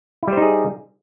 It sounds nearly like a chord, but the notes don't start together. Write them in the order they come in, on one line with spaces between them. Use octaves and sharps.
E4 G3 C5 D#4 G#4